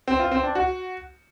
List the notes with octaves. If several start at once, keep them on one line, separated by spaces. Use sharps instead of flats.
C4
F4
C4
D4
F#4